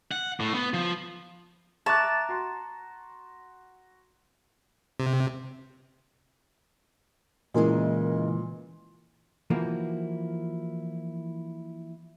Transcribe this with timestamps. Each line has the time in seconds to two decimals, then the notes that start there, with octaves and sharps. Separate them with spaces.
0.11 F#5
0.40 A2
0.54 B3
0.74 F3
1.86 E5 A5 A#5 C#6 D6 F#6
2.29 F#4 C6
5.00 C3
7.54 A#2 C#3 E3 G#3 E4 A#4 D#5
9.50 E3 F3 A#3 E4 F#4